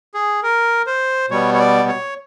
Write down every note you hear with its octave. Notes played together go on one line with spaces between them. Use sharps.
G#4
A#4
C5
B2 G3 B3 C#5
C#5
D5
C#5